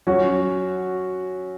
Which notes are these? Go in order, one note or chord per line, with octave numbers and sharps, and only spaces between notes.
F#3 C#4 F#4